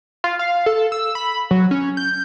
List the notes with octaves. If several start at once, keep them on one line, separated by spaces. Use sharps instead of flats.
F4
F5
A4
E6
B5
F#3
C#4
G6